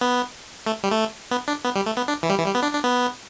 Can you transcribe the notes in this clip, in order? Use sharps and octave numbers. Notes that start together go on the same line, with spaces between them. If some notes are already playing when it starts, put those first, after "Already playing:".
B3
A3
G3
A3
B3
D4
B3
G3
A3
B3
D4
E3
G3
E3
G3
B3
D4
D4
B3